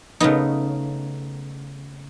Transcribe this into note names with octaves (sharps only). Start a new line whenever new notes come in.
C#3 A3 B3 D#4